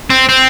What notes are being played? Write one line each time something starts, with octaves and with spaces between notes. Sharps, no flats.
C4
C4